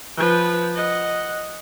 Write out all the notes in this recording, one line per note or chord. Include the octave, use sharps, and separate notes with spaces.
F3 B4
D#5 F#5